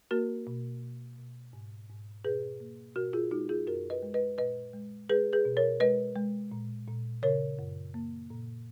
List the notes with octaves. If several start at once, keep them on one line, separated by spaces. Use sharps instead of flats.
A#3 F#4 A#4
B2
B2
B2
G#2
G#2
B2 G#4 B4
A#3
B2 F#4 A#4
F4 G#4
G#3 D#4 F#4
F4 G#4
F#2 F#4 A#4
B4 D#5
G#3
B4 D#5
A#2 B4 D#5
G#3
G#3 G#4 B4
G#4 B4
B2
A#4 C#5
G#3 B4 D#5
G#3
A#2
A#2
C#3 A#4 C#5
F#2
A#3
A#2